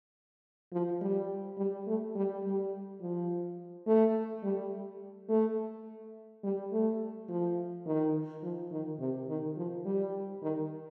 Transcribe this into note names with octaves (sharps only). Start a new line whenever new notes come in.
F3
G3
G3
A3
G3
G3
F3
A3
G3
A3
G3
A3
F3
D#3
F3
D#3
C3
D#3
F3
G3
D#3